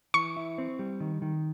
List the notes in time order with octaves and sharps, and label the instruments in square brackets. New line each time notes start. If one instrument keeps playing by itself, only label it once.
[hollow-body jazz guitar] E3 [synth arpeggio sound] C#6
[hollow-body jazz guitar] E4
C4
G3
D#3
D#3